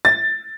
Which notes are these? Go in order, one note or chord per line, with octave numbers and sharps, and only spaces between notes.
A6